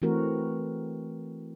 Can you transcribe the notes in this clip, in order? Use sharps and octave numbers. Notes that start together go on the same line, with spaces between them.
E3 A3 C4 F#4 A#4